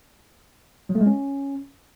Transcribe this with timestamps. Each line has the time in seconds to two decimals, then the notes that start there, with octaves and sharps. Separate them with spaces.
0.89 F#3
0.95 A3
1.01 G#3
1.06 C#4